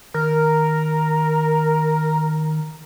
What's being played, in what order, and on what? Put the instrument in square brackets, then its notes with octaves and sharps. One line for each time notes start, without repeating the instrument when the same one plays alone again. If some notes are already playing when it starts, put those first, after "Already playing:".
[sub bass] D#3 [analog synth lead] A#4